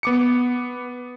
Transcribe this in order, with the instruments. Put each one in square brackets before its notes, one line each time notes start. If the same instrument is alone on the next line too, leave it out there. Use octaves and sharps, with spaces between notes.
[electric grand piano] B3 D6 C#7